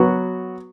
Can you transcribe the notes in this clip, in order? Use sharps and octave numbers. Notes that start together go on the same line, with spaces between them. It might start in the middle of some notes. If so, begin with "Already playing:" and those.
Already playing: F#3 B3 F#4